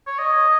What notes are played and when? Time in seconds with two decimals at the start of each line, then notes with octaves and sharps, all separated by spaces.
0.07 C#5
0.19 D#5